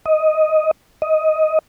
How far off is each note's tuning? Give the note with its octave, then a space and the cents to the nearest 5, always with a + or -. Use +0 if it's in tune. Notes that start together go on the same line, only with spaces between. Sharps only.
D#5 +5
D#5 +10